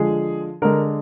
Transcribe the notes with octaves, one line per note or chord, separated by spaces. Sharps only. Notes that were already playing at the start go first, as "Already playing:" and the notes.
Already playing: D3 F3 G#3 G#4
D3 G#3 A#4